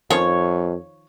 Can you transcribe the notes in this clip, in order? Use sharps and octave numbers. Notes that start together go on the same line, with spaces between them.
F2 D#3 F3 C#4 C#5